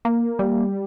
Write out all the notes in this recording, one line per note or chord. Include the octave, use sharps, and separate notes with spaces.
A#3
G3